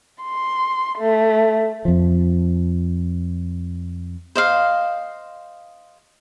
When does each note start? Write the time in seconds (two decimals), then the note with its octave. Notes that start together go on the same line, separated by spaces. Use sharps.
0.23 C6
0.99 A3
1.85 F2 F3
4.36 C5 D#5 F5